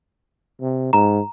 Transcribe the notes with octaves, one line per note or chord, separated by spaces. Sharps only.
C3
G#2 A#5